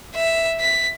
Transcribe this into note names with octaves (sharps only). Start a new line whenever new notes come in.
E5
B6